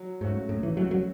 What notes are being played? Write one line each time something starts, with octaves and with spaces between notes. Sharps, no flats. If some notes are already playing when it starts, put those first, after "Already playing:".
Already playing: F#3
G#2 A3 C#4 F#4
A2 F#3
E3
F#3 A3 C#4 F#4
F#3